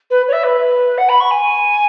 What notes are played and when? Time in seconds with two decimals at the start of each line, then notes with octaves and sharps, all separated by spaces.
0.10 B4
0.28 C#5
0.32 E5
0.43 B4
0.98 F#5
1.09 B5
1.20 C#6
1.30 G#5